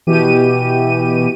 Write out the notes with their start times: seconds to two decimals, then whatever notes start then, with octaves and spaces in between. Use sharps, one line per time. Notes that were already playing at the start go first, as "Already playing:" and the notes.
0.07 B2 E3 G4 D#7